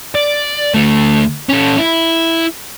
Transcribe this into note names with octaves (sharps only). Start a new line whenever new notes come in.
D5
D2 A3
C#4 A4
E4